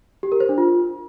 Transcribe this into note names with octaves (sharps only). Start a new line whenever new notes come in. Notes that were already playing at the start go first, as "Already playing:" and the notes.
G4
A#4
C5
D4
F4